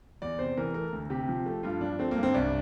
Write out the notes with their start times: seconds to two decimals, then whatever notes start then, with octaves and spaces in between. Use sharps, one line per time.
0.22 E2 D5
0.39 C3 C5
0.57 E3 A#4
0.74 A3 A#4
0.93 D2
1.10 C3 G4
1.29 F3
1.46 A3
1.63 G2 F4
1.81 F3 D4
1.99 A3 C4
2.11 A#3
2.17 G2
2.23 C4
2.34 C2 D4